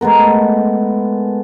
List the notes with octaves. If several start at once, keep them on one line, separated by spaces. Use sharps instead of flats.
G#3 A3 B3 A#4